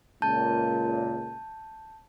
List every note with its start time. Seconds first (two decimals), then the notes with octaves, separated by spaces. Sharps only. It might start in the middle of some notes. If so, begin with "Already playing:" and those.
0.22 C#2 A#2 A5 G6